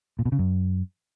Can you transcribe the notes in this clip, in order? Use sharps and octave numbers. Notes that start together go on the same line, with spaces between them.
A#2
B2
C#3
F#2